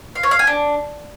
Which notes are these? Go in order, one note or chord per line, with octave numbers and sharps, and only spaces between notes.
F5
C#5
F5
G#5
D4